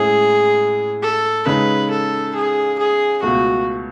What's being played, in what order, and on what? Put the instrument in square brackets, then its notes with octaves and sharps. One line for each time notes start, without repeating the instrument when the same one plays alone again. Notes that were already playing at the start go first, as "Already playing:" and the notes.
Already playing: [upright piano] A2 G#3 C#4 E4 [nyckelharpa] G#4
[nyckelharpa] A4
[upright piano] C#3 G#3 D#4 [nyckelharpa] B4
[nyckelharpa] A4
G#4
G#4
[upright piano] C#2 B2 A3 [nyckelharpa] F#4